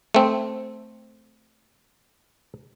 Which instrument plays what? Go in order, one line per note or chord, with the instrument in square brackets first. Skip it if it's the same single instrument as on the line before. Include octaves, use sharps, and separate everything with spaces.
[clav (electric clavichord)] A3 C4